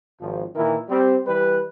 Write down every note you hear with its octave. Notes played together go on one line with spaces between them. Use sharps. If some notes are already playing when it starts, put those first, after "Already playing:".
G#1 F3
A#2 D#3 E3 E4 A#4
G3 C4
E3 G3 B4